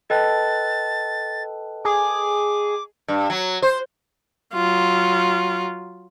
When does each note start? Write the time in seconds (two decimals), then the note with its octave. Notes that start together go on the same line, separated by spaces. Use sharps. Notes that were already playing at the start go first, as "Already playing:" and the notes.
0.10 A4 B4 D#5 G5 A5 A6
1.85 G#4 D6
3.08 G2
3.30 F#3
3.62 C5
4.53 F#3 F4